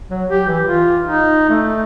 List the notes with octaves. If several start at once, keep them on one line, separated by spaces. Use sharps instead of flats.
F#3
G4
E3
F4
D#4
A3